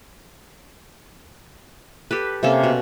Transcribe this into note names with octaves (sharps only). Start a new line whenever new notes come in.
G4 A4 B4
C3 A#3 C#4 A4
B2